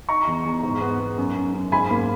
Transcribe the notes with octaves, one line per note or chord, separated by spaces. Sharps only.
D#4 A#5 C#6
E2
E2
G#2
B3
B3
F#2
F#2
F#2
G#2 G#5 B5
A#3